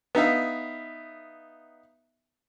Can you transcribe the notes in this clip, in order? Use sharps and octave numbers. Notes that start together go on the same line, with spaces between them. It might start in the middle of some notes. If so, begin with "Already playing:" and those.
B3 D#4 E5 F5